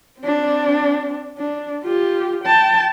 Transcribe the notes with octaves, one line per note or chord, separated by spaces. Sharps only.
C4 D4
D4
F4 G4
G5 A5